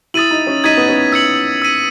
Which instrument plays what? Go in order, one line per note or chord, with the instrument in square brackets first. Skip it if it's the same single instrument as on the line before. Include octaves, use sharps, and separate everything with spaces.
[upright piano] E4 [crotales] D#6 A6 D#7 F#7
[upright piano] D#4
C#4
[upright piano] D#4 [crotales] G#6 B6 D#7
[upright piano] B3
C#4
[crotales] E6 G#6 C#7 F#7
E6 B6 D#7